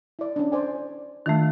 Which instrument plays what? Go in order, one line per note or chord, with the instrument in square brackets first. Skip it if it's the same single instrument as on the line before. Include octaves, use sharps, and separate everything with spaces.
[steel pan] E4 D5
C#4 D4
C5 D5 G#5
[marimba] D#3 A3 [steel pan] D4 F4 E5